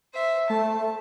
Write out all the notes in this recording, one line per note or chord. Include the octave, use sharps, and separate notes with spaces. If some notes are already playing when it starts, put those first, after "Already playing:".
C5 E5
A3 A5